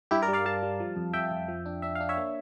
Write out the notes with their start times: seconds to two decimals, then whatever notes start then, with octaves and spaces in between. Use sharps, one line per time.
0.11 G2 E4 G4
0.22 A#4 D5
0.28 G3
0.33 D5 F5
0.45 G3 F5 A5
0.63 G3
0.80 F3
0.96 F2
1.13 F2 E5 G5
1.32 F2
1.48 F3
1.66 D4
1.82 D4 E5
1.95 F5
2.01 D4
2.09 C#5 E5
2.17 A#3